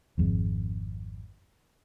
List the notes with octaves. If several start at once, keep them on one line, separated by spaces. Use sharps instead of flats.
G#1 F2 G#3